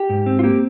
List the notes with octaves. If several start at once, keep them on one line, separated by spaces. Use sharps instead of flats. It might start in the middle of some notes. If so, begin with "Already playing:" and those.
Already playing: G4
G#2
C4
F4
A#3 G4